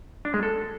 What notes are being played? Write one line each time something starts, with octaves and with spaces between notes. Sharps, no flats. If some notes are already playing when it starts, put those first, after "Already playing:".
D4
G#3
A4